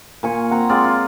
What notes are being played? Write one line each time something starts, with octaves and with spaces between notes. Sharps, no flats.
A#2 G#5 C#6
C4 F#5 A#5
G#3 C4 F4 D5
F4